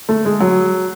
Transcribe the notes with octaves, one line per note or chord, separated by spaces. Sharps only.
A3
G#3
F#3